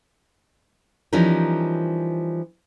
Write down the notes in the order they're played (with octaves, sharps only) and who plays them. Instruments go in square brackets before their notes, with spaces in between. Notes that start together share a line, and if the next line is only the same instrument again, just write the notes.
[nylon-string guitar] E3 F3 G3 C#4 D#4 A#4